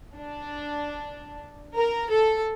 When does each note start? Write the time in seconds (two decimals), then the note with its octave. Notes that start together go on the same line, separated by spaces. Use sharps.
0.16 D4
1.77 A#4
2.11 A4